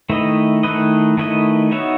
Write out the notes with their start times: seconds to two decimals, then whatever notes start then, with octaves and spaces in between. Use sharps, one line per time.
0.10 D#3 A3 E4 B4 D#5
0.63 D#3 A3 E4 B4 D#5
1.17 D#3 A3 E4 B4 D#5
1.71 B3 D#4 F#4 C#5 E5